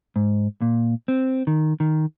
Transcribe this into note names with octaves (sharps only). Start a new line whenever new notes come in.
G#2
A#2
C4
D#3
D#3